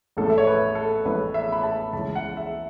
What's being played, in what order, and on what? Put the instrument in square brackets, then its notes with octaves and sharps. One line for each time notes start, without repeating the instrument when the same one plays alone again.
[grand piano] A1 A2 A3 A4
E5
C#5
B4
A4
A1 A2 A3 B4
E5
B5
A5
C#2 C#3 E3 A5
F#5
E5